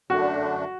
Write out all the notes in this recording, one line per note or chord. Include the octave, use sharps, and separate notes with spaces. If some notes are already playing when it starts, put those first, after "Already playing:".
F#2 D3 A3 D4 F#4